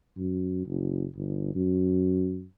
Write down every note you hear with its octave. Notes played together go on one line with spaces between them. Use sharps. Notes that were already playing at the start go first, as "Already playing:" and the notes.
F#2
F#1
G1
F#2